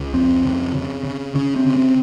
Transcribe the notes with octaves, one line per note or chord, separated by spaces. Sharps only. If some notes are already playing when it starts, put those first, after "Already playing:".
Already playing: C#2
F2 C4
C#3
C#3
C#3
C#3 C#4
C4
C#3
C4